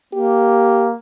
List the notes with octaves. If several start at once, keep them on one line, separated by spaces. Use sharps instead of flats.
A#3 G4